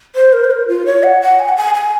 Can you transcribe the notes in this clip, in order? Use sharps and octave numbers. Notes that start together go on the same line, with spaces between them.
C5
A#4
C5
A#4
F4
C#5
F#5
F#5
G#5
F#5
G#5
G#5